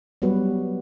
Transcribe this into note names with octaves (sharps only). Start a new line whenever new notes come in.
F#3 G3 B3 F#4 B4